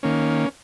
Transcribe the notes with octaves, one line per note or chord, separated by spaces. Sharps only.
D#3 A#3 C#4